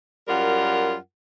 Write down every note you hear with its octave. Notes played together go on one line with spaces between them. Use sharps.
F#2 G3 F4 A#4 F#5